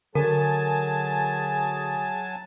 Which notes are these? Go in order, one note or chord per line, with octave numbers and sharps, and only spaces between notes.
D3 F#3 G#4 A#4 G#5 A5